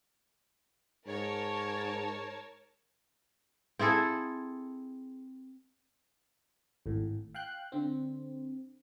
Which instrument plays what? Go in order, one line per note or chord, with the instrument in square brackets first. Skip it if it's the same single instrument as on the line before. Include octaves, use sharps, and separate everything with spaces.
[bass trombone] G#2 [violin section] A#4 C#5 A5
[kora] C4 E4 G#4 A4
[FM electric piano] G#1 A2
F5 G5 F#6 G6
D3 C4